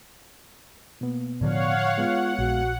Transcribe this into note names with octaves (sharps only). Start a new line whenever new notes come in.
B2 A#3 B3
A2 D3 F3 C#5 D5 F5 F#5
G#3 B3 F4 F5 F#5
A#1 F#4